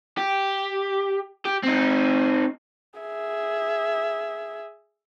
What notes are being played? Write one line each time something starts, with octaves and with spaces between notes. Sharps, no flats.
G4
G4
C4 D#4
G#4 E5